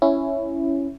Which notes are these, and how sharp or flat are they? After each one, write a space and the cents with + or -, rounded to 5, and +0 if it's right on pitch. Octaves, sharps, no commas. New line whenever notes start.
C#4 +0 E4 +5